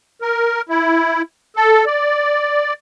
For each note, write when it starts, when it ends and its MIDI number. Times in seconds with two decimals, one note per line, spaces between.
0.22 0.62 70
0.69 1.22 64
1.56 1.85 69
1.86 2.73 74